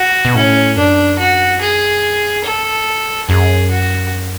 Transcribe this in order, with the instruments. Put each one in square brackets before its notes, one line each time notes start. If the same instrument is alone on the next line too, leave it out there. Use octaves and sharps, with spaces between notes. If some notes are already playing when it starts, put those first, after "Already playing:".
Already playing: [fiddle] F#4
[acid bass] B2
[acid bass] A2 [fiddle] C#4
[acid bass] F#2 [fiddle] D4
[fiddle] F#4
G#4
A4
[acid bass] F#2 [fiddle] G#4
[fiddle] F#4